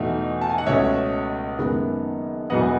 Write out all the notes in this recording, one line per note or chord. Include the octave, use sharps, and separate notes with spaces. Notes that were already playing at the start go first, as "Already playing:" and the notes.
Already playing: E2 B2 A3 D#4
A5
G#5
F#5
C#2 B2 A3 C#4 C#5 E5
F#1 F#2 D#3 G#3 B3
E1 E2 B2 F#3 B3 D#5 F#5